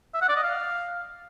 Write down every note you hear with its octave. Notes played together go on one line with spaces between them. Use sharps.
E5
F#5
D5
D#5
F5